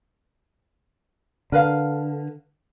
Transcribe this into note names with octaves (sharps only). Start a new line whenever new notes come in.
D3 A#4 B4 F5